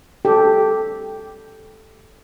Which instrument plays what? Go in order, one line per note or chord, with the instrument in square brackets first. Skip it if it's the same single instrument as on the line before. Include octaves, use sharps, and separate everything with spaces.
[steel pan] G4 A4